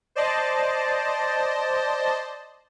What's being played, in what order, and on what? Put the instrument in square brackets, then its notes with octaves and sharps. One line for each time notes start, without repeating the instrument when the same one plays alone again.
[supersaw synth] C5 D5 D#5 A5